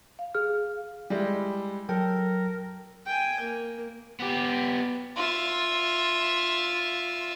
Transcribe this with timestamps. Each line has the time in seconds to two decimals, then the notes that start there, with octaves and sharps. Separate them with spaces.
0.19 F5
0.35 G#4 F6
1.10 G3 G#3 E4
1.89 F#3 A4 A#4 G5
3.06 G5 G#5
3.40 A#3
4.20 B3 G4
5.17 F4 E5